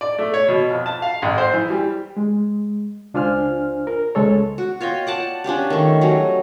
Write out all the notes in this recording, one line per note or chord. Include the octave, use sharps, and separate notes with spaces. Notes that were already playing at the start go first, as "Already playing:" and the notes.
D5
A3
C#5
B2
F2
A5
F5
A1
C5
E3
G3
G#3
C#2 D4 F4 C5 G#5 F6
A#4
C#2 G#3 A4 C#5
F#4
F4 C#5 D#5 G5
D5 F#5 A5
C#4 D4 F4 G4
D#3 A3
F#3 G3 C#4